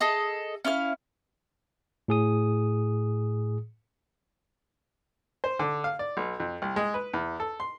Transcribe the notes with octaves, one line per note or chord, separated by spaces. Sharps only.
G#4 A4 D#5
C#4 E4 F5 F6
A2 G#4 D#6
C5
D3
F5
D5
B1
F2
C2
G#3
B4
E2
A4
C6